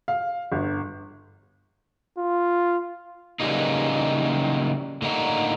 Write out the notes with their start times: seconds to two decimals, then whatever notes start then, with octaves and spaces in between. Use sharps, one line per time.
0.08 F5
0.52 G1
2.17 F4
3.40 C#3 E3 F#3 G3 A#3 D#4
5.02 A2 D3 A#3 D#4 F#5 A#5